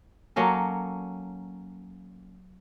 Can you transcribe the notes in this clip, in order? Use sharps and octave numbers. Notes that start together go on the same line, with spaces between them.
F#3 A#3 C#4 A4